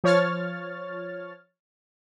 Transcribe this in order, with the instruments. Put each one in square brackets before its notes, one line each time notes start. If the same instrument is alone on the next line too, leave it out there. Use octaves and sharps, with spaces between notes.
[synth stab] F3 C#5 F6 A6